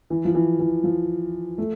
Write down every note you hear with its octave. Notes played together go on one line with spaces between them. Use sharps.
E3
F3
E3
E3
F3
A3